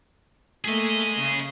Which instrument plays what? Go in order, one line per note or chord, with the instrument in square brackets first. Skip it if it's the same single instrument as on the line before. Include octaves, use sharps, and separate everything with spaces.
[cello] A3 A#3 [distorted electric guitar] G#4 D#5
[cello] C#3